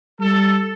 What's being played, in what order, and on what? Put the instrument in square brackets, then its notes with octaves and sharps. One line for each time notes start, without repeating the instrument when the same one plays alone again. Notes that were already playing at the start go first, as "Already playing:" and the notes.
[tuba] G3 [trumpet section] A4